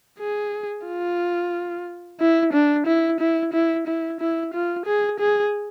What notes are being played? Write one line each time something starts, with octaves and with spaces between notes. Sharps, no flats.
G#4
F4
E4
D4
E4
E4
E4
E4
E4
F4
G#4
G#4